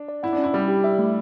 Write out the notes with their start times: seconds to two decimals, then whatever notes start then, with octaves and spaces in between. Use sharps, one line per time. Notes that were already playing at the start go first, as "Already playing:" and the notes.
Already playing: D4
0.08 D5
0.23 E4 F#5
0.33 D4
0.38 C#4
0.44 E4
0.53 G3 D5
0.68 G4
0.84 E5
0.99 A3